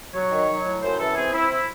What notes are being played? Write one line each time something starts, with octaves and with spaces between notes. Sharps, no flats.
F#3 C#5
D#3
F#3
A2
F#2 C5
E3 A4
C4 G#4
C4 E4
E4